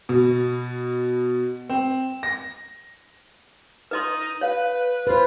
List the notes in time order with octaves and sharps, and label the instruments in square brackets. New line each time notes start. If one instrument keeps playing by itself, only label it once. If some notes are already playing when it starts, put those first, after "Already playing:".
[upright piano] B2
C4
A#6
[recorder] D#4 [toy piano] B4 D#5 C6
[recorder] B4 [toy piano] C#5 F5
[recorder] F4 [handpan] B4 C5